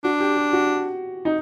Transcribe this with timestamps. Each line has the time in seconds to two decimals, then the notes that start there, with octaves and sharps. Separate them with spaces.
0.04 D4 F#4
0.20 G4
0.37 G4
0.53 F#4
1.25 D#4